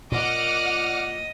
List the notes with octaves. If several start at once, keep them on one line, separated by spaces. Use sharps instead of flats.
A#2 D5 D#5 F#5 D6 F6